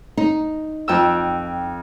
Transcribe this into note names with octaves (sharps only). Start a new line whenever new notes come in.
D#4
F2 G5 E6